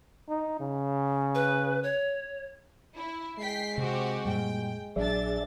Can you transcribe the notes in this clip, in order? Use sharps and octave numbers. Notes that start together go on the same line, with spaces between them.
D#4
C#3
B4
C#5
E4
G#3 G5 B6 C7
C3 C4 F#4 G4
F#2 A#2 G3 G5
A#1 F#3 D4 G#4 D5 E5 A6